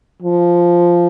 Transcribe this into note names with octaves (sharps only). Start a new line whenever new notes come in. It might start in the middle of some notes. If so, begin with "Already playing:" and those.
F3